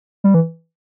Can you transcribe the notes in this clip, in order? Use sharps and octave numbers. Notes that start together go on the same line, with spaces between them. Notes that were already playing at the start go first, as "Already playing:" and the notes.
G3
E3